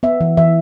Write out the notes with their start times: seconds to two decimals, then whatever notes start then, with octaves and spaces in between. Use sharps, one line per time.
0.03 B3 E5
0.21 E3
0.37 E3 E5